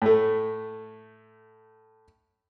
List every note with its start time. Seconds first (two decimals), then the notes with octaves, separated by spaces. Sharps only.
0.02 A2 A3